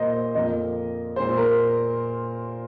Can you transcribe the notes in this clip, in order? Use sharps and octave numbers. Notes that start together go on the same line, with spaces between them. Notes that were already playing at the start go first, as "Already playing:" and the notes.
Already playing: A#2 A#3 C5 D#5
F2 F3 A#3 D#5
A#2 G#3 C5
A#4